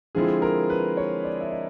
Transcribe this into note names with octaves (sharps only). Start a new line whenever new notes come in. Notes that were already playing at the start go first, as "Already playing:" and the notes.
D3 F3 G#3 C4 E4 G#4
A#4
B4
C#5
D5
E5
D#5